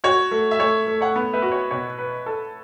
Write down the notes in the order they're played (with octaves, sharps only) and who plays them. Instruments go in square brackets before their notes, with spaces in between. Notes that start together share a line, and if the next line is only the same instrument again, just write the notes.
[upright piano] F#4 [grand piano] C#5
[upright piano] A3
[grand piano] E5
[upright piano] A3 [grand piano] C#5
[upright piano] A3
[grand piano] C#5 F#5
[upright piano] B3
[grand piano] B4 E5
[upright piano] F#4
[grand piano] C#5
[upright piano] B2 [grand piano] C#5
[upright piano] B4
A4